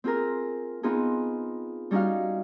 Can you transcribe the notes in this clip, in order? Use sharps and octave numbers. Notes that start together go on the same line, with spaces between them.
C4 F4 G#4 A#4
B3 C4 D#4 F4 G#4
G3 C#4 D#4 F#4 F5